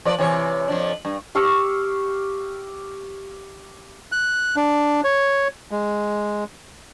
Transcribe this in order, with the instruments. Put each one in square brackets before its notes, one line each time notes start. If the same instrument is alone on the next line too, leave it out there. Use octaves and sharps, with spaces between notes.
[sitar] F3 B4 D5
C3 E3 C#5
F2 F3 D4
G2
[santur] G4 F5 C#6 E6
[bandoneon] F#6
D4
C#5
G#3